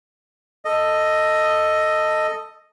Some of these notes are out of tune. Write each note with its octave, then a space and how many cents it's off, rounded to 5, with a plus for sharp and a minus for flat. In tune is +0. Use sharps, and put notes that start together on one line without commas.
A4 +5 D#5 +0